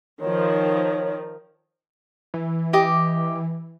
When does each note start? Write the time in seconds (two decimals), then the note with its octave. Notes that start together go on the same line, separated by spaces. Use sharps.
0.20 D#3 F3 C#5
2.34 E3
2.73 G4 D#5 D6